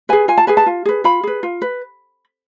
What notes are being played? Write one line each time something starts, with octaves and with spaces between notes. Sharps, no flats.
G#4 B4 G#5
F4 G#5
A5
G#4 B4 G#5
A5
F4
G#4 B4
F4 B5
G#4 B4
F4
B4